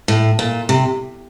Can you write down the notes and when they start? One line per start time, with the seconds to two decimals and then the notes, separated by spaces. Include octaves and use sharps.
0.08 A2
0.39 A#2
0.69 C3